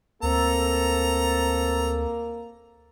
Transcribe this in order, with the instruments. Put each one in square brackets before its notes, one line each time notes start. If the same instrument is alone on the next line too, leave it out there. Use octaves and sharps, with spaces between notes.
[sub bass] D2 [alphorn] A#3 [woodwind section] C4 A4 [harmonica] A#5